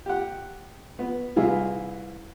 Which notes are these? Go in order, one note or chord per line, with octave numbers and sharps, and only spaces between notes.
G4 F#5
B3
C2 E3 E4 F4 G#4